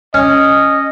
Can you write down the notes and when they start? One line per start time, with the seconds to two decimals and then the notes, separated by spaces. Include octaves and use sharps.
0.14 C#4 D#5